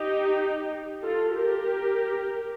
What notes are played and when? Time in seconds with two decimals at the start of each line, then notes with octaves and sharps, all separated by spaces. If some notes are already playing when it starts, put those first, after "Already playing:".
Already playing: D#4 G4
1.03 F4 A4
1.34 G4 A#4